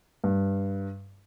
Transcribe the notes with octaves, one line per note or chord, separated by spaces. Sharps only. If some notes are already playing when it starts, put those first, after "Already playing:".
G2